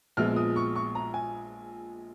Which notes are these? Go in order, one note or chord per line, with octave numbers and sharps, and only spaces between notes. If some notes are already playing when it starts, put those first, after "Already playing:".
A#1 A#2 F3 G#3 B3 F6
D#6
C#6
C#6
A#5
G#5